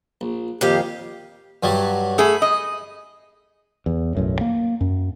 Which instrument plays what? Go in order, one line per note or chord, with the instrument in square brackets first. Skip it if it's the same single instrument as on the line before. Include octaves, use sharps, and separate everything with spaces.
[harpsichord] A#1
[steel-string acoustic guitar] F2 D#3 F5 [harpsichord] A#2 G#5 [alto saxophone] G4
[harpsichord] G2 F#3 G3
[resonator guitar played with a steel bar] A3 G#4 [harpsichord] B5
[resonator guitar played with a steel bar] D#5
[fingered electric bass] E2
B1 F#2 A2
A#3
F#2